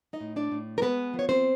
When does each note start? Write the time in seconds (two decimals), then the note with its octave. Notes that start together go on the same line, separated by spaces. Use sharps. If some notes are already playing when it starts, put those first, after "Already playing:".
0.13 D#4 D#5
0.21 A2
0.36 D4 D5
0.52 A2
0.78 A#4
0.82 G#3 B3 B4
1.14 F3
1.19 C#5
1.29 C4 C5